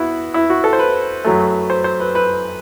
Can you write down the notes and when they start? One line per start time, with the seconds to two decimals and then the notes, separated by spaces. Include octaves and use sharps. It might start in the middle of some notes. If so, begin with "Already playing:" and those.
Already playing: B3 E4 F#4
0.34 E4
0.50 F#4
0.64 A4
0.73 C5
0.79 B4
1.24 F#2 F#3 A3
1.70 C5
1.84 C5
2.00 B4
2.15 B4